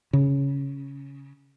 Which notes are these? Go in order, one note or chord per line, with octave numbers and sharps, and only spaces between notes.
C#3